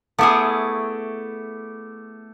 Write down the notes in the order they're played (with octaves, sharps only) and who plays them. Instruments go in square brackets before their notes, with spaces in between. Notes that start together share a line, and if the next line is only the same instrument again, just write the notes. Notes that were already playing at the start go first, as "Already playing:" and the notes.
[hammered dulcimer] A3 D6 [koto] B3 E4 G#4